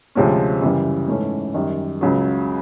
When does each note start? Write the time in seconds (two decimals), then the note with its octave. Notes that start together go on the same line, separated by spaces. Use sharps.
0.15 D2 C3 F3 G#3 C#4
0.62 F#2 C#3 E3 G3
1.08 G#2 E3 A3 C#4
1.54 F#2 D#3 G3
2.01 C#2 C#3 F#3